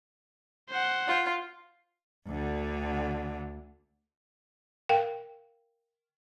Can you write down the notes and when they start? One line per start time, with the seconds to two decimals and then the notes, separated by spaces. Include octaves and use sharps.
0.70 C5 F#5
1.08 F4
2.27 D2 D3
4.89 A#4 F5 G5